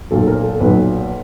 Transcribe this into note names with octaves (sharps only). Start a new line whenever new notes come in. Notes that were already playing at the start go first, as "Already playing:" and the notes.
B1 A#2 F#3 A4
A#4
A4
B1 A#2 F#3 B4